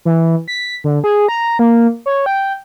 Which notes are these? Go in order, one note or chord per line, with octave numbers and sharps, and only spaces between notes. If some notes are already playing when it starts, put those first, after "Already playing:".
E3
B6
D3
G#4
A#5
A#3
C#5
G5